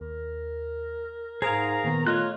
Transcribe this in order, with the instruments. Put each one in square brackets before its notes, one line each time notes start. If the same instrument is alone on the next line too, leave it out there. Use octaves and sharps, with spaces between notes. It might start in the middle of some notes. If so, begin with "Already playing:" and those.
[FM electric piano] D#2 [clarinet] A#4
[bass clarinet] G#2 [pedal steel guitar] G#4 A#4 F5 [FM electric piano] C5 D#6 [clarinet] A#5
[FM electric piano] A#2 B3 [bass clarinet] D#3
[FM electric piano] A3 [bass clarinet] F4 [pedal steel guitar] C#5 D#5 F#6